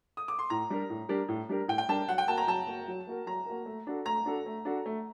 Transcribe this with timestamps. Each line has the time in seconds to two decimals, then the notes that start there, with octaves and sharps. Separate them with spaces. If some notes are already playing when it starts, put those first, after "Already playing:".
0.17 D#6
0.28 D6
0.39 C6
0.50 A2 A#5
0.70 G3 D4 G4 A#4
0.90 A2
1.09 G3 D4 G4 A#4
1.28 A2
1.49 G3 D4 G4 A#4
1.68 A2 G5
1.78 G5
1.89 G3 D4 G4 A#4 A5
2.08 F#3 F#5
2.18 G5
2.27 A#3 F#4 A#4 A5
2.38 A#5
2.47 F#3 A5
2.67 A#3 F#4 A#4
2.88 F#3
3.07 A#3 F#4 A#4
3.27 F#3 A#5
3.46 A#3 F#4 A#4
3.66 A3
3.87 D4 F#4 A4
4.06 A3 A#5
4.25 D4 F#4 A4
4.46 A3
4.65 D4 F#4 A4
4.86 A3